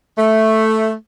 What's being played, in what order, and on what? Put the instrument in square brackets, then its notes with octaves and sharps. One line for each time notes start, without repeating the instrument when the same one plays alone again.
[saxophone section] A3